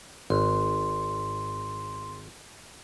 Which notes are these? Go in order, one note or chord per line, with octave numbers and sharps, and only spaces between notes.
G#1 C6